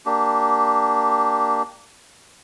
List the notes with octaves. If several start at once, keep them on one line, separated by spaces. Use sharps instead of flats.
A#3 D4 G4